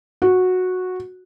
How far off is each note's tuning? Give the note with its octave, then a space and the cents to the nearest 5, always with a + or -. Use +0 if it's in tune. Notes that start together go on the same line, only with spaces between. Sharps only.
F#4 -10